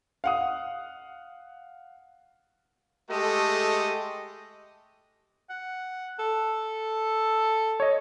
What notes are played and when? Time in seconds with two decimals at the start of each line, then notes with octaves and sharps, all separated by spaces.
0.24 F5 F#5 D#6
3.10 G#3 A3 G4 A4 D#5
5.50 F#5
6.19 A4
7.80 C#5 D#5